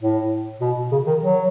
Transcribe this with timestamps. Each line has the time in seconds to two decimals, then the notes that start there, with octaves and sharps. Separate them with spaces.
0.01 A2
0.61 B2
0.92 C#3
1.07 D#3
1.23 F#3